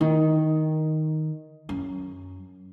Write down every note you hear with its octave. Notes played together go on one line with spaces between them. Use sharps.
D#3
F#2